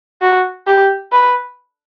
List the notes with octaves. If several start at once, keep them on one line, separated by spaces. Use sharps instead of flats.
F#4
G4
B4